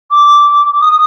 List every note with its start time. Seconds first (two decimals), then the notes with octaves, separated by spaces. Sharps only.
0.10 D6
0.80 D#6